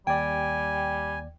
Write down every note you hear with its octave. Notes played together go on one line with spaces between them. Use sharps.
D#2 G3 D5 G5 G#5